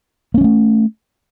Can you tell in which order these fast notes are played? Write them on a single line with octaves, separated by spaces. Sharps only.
A#3 C#4 G3 A3